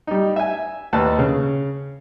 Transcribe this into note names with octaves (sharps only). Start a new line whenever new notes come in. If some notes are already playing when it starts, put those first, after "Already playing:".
G3 D#4
E5 G#5
D#2 B4 A5
C#3